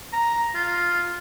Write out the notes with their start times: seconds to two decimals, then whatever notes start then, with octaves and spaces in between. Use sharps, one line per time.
0.13 A#5
0.55 F4